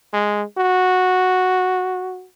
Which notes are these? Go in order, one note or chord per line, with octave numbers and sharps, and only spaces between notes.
G#3
F#4